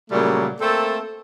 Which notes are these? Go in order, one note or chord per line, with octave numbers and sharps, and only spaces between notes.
A#2 C#3 F#3 G3 A3 A#3
A3 A#3 C4 A4